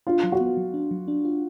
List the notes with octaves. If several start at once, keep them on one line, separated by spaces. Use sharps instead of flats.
D4 F4
F#3
F#4
B3
F#3
D4
F#3
D4
F4